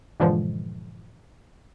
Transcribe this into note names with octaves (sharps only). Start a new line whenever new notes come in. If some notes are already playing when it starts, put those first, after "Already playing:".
G2 A#2 D3 E3 F3 G#3